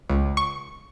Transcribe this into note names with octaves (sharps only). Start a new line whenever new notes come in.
C#2
C#6